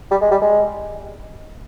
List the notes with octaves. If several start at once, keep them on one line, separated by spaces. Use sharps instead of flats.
G3
G#3
G3
G#3